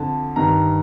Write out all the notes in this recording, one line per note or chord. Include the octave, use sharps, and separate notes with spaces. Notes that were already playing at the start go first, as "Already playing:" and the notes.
Already playing: F2 D3 A5
G2 D#3 A#5